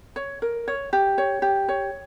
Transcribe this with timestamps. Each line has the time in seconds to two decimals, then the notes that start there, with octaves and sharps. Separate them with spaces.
0.16 C#5
0.42 A#4
0.68 C#5
0.93 G4
1.18 C#5
1.42 G4
1.68 C#5